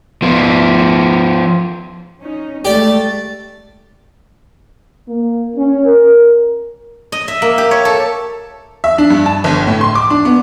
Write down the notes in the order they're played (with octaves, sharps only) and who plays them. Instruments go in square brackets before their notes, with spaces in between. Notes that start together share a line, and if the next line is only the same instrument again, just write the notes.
[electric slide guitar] F3 B3
[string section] C#4 D#4
[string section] G#3 A3 A6 [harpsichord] G4 D5
[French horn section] A#3
C#4
A#4
[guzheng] D#5
E5
A#3
G4
C#5
A4
[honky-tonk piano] E5
D4
G2
A5
G1
A2
C6
D6
D4
B3